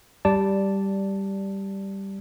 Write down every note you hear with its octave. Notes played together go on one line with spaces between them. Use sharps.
G3 D5 A5